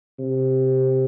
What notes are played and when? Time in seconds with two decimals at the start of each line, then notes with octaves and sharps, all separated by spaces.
0.19 C3